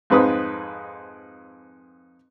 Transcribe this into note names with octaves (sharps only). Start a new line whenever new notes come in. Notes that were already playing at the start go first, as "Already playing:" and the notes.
F2 G#2 B4 C5 D#6